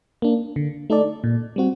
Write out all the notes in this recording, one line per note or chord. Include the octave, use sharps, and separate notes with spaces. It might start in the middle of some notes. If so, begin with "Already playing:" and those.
A#3 D4
D3
A3 D#4 A4 D5
A#2
G3 C4 F#4